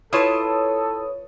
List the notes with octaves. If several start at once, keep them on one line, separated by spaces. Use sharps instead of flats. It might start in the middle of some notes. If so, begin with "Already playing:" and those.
E4 F4 A4 B4 C#5 A5 D#6